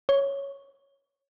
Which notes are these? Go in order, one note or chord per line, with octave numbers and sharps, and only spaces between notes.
C#5